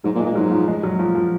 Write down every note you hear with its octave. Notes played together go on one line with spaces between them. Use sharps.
G#2 F#3
A#2
G#3
A#2
G#2 F#3
F3
G#3
F#3
F3
F3